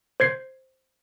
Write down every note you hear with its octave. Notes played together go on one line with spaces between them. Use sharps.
C5 G#6 C7